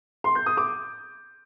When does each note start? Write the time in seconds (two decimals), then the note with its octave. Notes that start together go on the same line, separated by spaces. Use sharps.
0.24 C6
0.35 G6
0.46 D#6
0.57 D6